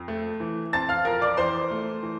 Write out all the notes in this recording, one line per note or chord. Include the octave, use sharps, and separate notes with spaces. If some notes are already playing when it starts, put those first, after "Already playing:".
Already playing: F2
A3
E3
C4 A5 A6
F5 F6
F2 A#4 A#5
D5 D6
E3 C5 C6
A3
E3